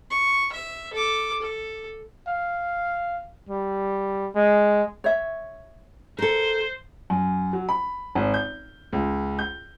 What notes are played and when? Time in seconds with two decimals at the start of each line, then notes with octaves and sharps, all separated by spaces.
0.10 C#6
0.52 E5
0.93 A4 D6
1.41 A4
2.28 F5
3.49 G3
4.35 G#3
5.04 C#5 E5
6.19 A4 A#4 C5
7.10 F#2
7.53 F#3
7.69 B5
8.15 G#1
8.34 G6
8.93 C#2
9.39 G6